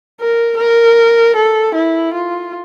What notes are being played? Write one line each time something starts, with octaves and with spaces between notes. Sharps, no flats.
A#4
A#4
A4
E4
F4